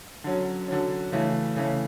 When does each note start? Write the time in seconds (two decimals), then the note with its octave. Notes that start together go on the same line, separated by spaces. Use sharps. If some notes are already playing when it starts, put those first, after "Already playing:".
0.24 D3 F#3 C#4
0.68 D3 F#3 C#4
1.12 C#3 E3 A3 C#4
1.56 C#3 E3 A3 C#4